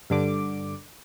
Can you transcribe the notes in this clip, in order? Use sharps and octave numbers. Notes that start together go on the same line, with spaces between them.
G2 D3 D6